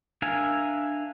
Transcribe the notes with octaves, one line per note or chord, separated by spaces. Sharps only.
D4 A#4 E5 F5 G#5